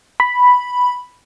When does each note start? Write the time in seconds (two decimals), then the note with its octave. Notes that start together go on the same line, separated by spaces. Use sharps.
0.20 B5